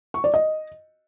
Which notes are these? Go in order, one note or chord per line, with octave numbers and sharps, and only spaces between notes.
C#6
D5
D#5